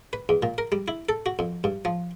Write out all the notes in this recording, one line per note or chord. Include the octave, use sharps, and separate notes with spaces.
B4
E2
A#2
A#4
G3
E4
A4
F#4
F2
G2
F3